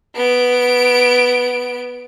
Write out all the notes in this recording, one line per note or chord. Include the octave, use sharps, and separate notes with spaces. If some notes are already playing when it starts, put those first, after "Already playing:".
B3 D7